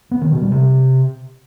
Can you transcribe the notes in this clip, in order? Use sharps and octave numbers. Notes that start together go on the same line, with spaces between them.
B3
D#3
B2
G3
C3